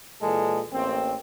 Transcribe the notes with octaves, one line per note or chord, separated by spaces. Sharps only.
A#2 E3 G#3 A4
A1 A#3 C4